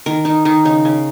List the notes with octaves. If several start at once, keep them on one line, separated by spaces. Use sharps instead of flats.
D#3 A#4
D#3 D#4
D#3 D#4
C#3 D#4
C#3